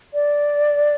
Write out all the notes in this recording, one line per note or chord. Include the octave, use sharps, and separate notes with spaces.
D5